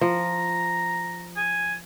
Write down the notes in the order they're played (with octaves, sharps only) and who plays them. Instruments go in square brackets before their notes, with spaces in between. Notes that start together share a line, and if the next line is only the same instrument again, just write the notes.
[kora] F3 [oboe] A#5
[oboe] G#5